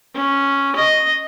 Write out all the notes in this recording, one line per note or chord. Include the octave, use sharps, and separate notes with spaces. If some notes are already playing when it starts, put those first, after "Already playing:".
C#4
D#5